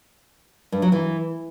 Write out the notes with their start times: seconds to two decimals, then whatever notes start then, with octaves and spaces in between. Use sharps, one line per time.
0.72 G2
0.82 F#3
0.92 E3